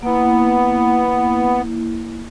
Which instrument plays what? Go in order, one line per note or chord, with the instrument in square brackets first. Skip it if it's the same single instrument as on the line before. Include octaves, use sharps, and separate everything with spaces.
[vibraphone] A#3 E4 [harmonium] B3